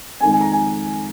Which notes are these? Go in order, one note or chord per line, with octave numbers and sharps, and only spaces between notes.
F2 D#3 G#3 G#5
G#5
A#5
G#5